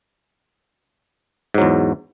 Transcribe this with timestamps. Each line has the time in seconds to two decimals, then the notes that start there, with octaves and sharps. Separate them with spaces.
1.54 G#2
1.58 F#3
1.62 E2